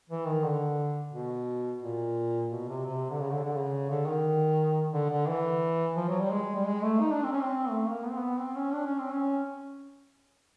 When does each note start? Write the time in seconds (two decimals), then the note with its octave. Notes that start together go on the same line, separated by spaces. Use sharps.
0.09 E3
0.26 D#3
0.44 D3
1.13 B2
1.82 A#2
2.51 B2
2.69 C3
2.86 C3
3.10 D3
3.20 C#3
3.32 D3
3.44 D3
3.55 C#3
3.90 D3
4.06 D#3
4.93 D3
5.10 D3
5.28 E3
5.96 F3
6.09 F#3
6.20 G3
6.31 G#3
6.55 G3
6.67 G#3
6.83 A3
7.00 D#4
7.12 D4
7.24 C4
7.32 C#4
7.42 C4
7.70 A3
7.87 A#3
8.04 B3
8.11 C4
8.18 B3
8.38 C4
8.56 C#4
8.73 D4
8.86 C#4
8.99 C4
9.12 C#4